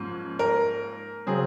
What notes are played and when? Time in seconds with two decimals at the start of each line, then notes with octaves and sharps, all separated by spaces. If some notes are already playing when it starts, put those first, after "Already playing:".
Already playing: G#2 F3 A#3 C#4
0.39 A#4
1.27 C#3 F#3 C4 G#4